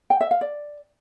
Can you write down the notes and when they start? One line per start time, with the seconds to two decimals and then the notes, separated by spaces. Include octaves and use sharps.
0.10 G5
0.21 E5
0.31 F5
0.41 D5